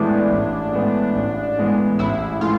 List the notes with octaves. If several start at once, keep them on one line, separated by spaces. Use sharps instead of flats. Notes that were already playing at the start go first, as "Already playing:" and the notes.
Already playing: A2 E3 G#3 B3 D4
A1
A2 E3 G#3 B3
A1
A2 E3 G#3 B3
A1 E4
A2 E3 G#3 F4